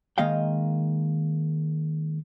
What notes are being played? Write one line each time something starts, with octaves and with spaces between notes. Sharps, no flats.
D#3 G#3 A#3 D#5 F5 G5